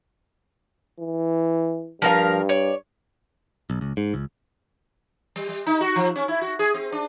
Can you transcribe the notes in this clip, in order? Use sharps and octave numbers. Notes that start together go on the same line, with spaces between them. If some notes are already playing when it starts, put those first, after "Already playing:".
E3
G2 F3 A#4 F5
C#5 D5
B1
C#2
G#2
C#2
G3
G3
D#4
F#4
F3
C#4
E4
F#4
G#4
C4
D4